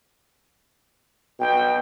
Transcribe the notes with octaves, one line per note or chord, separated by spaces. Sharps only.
B2 G5